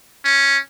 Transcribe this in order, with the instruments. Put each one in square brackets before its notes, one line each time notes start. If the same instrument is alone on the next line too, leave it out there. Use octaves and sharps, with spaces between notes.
[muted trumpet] C#4